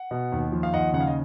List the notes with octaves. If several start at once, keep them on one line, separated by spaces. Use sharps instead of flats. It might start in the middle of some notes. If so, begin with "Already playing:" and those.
Already playing: F#5
B2
D#2
F3
F5
D#2 D#5 F#5
C#3 F#5
F5
D#5